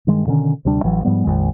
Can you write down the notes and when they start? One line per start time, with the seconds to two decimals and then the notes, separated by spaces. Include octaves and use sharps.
0.07 G2 D#3 G#3
0.26 B2 D3 D#3 C#4
0.65 D2 C3 G3 D4
0.84 A1 E3 F#3
1.05 G#2 F3 G3 B3
1.24 A#1 F2 D#3 G#3